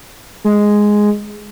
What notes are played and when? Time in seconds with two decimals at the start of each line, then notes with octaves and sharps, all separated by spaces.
0.45 G#3